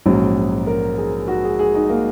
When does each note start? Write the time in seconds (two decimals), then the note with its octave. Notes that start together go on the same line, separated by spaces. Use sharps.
0.06 A#1 G#2 F#3 C#4
0.67 A#4
0.98 G#4
1.28 F#4
1.44 G#4
1.59 G#4
1.75 D#4
1.89 A#3